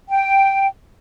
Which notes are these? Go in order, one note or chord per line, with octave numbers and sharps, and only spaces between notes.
G5